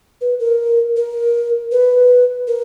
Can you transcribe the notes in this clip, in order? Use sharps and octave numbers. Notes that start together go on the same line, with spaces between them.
B4
A#4
A#4
B4
A#4